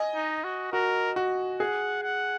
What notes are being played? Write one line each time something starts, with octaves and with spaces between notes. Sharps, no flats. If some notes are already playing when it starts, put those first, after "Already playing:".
Already playing: D#5 G#5
D#4
F#4
F#4 A#4
F#4
G#4 F#5
F#5